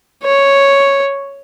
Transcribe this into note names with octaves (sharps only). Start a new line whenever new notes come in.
C#5